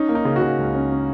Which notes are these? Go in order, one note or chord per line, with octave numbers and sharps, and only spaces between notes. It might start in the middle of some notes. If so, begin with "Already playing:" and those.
Already playing: C#4 D#4
A#3
D#4
C#3
F#4
C#3
C#2
C#4
C#4